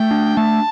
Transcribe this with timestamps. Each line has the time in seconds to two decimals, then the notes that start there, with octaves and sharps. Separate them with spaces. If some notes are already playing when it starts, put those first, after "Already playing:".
Already playing: A3 G5
0.11 D4
0.37 A3 A5